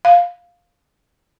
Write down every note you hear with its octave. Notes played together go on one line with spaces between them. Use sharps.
F5